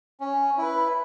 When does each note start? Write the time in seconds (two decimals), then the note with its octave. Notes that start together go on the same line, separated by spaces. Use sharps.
0.20 C#4
0.58 E4 B4